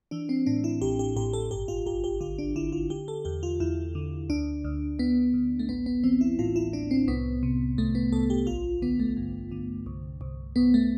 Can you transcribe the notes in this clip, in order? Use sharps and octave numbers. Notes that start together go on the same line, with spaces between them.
E3 D4
C4
A2 D4
E4
A1 G4
G4
A1 G4
A4
G1 G4
F4
G1 G4
G4
D3 F4
D4
D3 E4
F4
D3 G4
A4
E2 G4
F4
E2 E4
D3
D2 D4
D2
D2 B3
D2
A3
A1 B3
B3
E3 C4
E4
A2 F4
E4
A2 D4
C4
C2 B3
C3
C2 A3
B3
C2 A4
G4
A1 F4
D3 B3
A3
G2
D3
C2
C2
C2 B3
A3